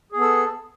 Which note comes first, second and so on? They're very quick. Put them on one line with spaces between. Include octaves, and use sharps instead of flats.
G#4 B3 A4